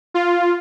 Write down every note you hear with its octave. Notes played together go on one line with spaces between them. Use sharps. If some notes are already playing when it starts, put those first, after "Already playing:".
F4